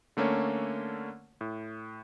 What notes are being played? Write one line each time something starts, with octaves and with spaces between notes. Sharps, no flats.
D3 A3 A#3 C#4 C#5
A2